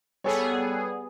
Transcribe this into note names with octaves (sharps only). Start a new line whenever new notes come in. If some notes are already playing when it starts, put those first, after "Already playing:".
G3 B3 G#4 A4 C#5